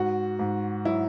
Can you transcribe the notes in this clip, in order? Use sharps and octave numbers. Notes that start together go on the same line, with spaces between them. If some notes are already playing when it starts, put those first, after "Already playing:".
Already playing: G#2 F#4
G#2
F#3 E4